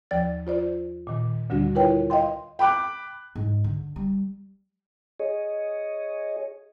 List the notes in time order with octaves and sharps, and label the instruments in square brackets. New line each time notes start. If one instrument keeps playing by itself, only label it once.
[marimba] D#2 F3 D5 A6
F4 C5 D5
A#2 D#3
D2 D3 G3 D4 F#4
E4 F4 A#4 B4 C#5 G5
D#5 F5 G5 C6
[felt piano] G5 B5 D6 F#6
[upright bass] G#2
D3
G3
[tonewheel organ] G#4 C#5 D#5